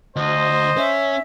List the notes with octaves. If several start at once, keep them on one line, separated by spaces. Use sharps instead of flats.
D2 C5 D#5
C#4 E5